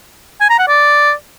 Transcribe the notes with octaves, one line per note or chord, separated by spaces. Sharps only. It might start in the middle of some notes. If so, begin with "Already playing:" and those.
G#5
A#5
F#5
D5